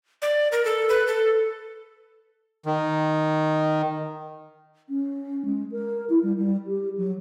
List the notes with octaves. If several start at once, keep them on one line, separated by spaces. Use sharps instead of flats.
D5
A#4
A4
B4
A4
D#3
C#4
G#3
A#4
E4
G3
G3
G4
F#3